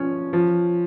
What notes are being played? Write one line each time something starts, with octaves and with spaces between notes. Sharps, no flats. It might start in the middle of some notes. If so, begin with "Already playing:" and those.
Already playing: F3 C#4
F3